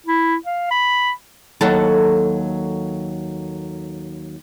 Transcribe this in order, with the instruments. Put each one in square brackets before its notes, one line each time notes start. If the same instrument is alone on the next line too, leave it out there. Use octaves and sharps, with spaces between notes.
[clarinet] E4
F5
B5
[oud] D#2 F#3 A4